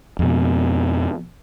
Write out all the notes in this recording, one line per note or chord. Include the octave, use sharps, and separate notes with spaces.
F2 B2